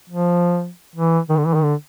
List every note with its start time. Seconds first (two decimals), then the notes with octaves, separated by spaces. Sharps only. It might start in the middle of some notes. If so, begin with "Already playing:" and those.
0.10 F3
0.95 E3
1.29 D#3
1.37 D3
1.46 E3
1.54 D#3
1.63 D3